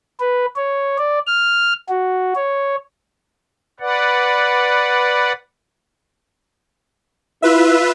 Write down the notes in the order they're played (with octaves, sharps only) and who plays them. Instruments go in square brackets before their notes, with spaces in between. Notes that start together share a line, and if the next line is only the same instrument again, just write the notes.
[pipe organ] B4
C#5
D5
F6
F#4
C#5
B4 D5 F#5
[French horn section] E4 [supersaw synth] F4 B4 E5